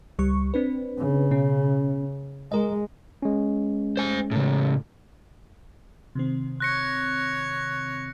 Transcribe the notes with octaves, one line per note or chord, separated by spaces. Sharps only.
C#2 G3 C#6
C4 D4 B4
C#3
B2 C#4
G#3 G#4 A#4 D#5
G#3 C#4
C5 G#5
A2 C#3
C3 D#3 C4
C#5 F#6 A#6 C#7